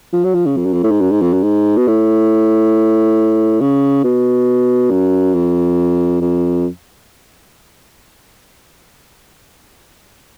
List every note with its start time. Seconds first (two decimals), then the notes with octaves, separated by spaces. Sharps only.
0.13 F3
0.24 F#3
0.35 F3
0.46 C#3
0.57 F2
0.65 F#2
0.73 F2
0.83 A2
0.91 G#2
1.01 F#2
1.11 G#2
1.22 F2
1.33 F#2
1.43 G#2
1.77 B2
1.88 A2
3.61 C#3
4.04 B2
4.91 F#2
5.35 F2
6.21 F2